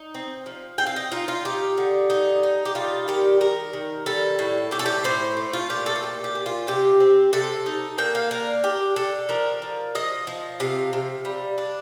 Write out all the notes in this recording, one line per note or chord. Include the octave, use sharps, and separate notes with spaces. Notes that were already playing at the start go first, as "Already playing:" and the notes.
Already playing: D#4
C4
F3
C4 G5
F5
D#5
D#4 F4
F4
D#4 G4
D3
D#4
D#4
G4
G3 F4
D#3 G4
D#3 A#4
D#3
G3 A4
A2
A2 G4
A4
G4
A2 C5
A3
F4
A#2 G4
A4
F4
A#2 G4
G4
A#2
F4
C3 G4
C4
C3 A4
D#4
A#3 G5
F5
D4 A#4
D4 G4
D4 A4
F3 A#4
F3
F3 D#5
F3
C3 F5
C3
G3
D4